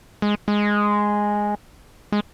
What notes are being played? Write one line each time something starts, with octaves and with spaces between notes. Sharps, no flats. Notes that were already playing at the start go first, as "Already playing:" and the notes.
G#3
G#3
G#3